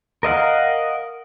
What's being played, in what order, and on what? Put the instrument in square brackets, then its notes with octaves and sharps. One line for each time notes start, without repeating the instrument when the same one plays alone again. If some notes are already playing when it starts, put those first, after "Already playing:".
[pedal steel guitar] A#4 D#5 F5 F#5